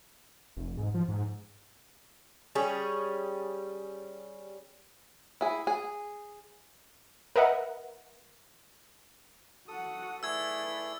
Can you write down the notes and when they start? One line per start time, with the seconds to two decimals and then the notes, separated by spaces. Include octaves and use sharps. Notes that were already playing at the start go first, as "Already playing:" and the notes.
0.57 F1
0.77 G#2
0.94 F3
1.08 G#2
2.55 G3 C#4 G#4
5.41 E4 G#4
5.67 G#4
7.36 A#4 B4 D#5 E5 F#5
9.68 F#4 A4 F#5 D#6
10.23 A3 E4 G#4 B4 D5 E6 G#6